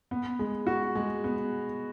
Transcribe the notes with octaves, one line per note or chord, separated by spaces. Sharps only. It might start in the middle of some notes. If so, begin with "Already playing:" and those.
B3
G#3
F#4
G#3
B3